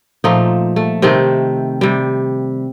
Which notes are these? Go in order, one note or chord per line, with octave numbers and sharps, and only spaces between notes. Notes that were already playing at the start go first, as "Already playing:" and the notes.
A#2 F3 A3 D#4
A3
C3 D#3 A3 C4
C3 G3